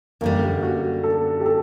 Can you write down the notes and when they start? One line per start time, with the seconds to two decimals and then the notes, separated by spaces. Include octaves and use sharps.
0.21 F#2 D3 G3 A#3
0.63 F#4
1.04 A4
1.40 G4
1.46 A4